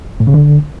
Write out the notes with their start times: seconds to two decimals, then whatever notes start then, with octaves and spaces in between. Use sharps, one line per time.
0.20 A2
0.27 C#3
0.34 D3